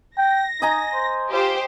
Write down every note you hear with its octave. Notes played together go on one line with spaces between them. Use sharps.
G5 A#6
D#4 D#5 G#5 A#5
C5
F4 G4 C5